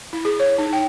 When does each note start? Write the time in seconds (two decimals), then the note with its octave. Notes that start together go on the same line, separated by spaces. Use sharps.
0.13 E4
0.25 G#4
0.40 C#5
0.58 D#4
0.73 G5